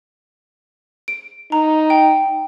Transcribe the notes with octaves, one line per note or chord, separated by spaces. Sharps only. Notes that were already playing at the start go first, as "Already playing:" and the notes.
D7
D#4 A#5
G5